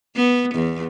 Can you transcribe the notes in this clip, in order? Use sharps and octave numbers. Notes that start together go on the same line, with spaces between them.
B3
E2